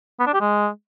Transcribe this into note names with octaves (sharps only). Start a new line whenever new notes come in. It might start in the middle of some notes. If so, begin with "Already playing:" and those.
B3
D4
G4
G#3